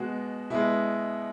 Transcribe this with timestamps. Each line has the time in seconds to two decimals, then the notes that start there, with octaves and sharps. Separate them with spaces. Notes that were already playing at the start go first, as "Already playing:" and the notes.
Already playing: B2 G#3 F#4
0.50 B2 G#3 E4